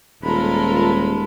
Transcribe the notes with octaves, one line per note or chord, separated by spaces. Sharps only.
D#1 G#3 F4 A4 A#4 B5